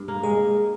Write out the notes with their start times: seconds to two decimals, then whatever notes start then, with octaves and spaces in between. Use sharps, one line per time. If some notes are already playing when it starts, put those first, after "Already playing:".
Already playing: G2
0.08 A#3
0.23 G#3 G#4